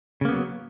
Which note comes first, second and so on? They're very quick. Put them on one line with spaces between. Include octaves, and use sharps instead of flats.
C#3 A#3 B3 F#3